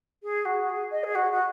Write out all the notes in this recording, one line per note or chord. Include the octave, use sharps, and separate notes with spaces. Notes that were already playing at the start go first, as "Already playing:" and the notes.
G#4
F#4
G#4
D#5
G#4
F#4
F#4